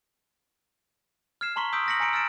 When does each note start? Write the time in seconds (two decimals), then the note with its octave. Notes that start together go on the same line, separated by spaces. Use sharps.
1.41 F6 G#6 C7 E7
1.56 A5 A#5 C6 C#6 B6 G7
1.73 C#6 D#6 E6 G6 B6 D7
1.86 C#6 F6 A#6 B6 C#7 F#7
2.00 G#5 A#5 C#7 D7 F#7
2.13 E6 F6 A6 B6 D7 E7